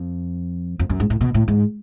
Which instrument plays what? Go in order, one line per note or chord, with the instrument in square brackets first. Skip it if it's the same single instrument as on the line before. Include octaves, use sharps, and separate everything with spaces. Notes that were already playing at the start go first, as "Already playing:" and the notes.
Already playing: [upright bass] F2
F2
F#2
G#2
A2
B2
A2
G#2